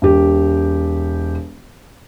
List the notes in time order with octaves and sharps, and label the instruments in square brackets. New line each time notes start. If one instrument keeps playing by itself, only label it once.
[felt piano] E1 G4